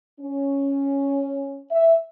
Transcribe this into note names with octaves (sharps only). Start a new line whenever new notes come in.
C#4
E5